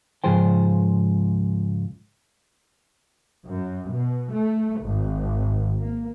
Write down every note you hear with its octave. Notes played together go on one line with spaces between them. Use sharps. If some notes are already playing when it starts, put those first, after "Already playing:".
C#2 G#2 F3 G#4 C5 G5
F#2
B2
A3
G#1
A#3